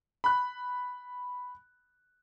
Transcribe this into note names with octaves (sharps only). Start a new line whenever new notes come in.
B5 F#6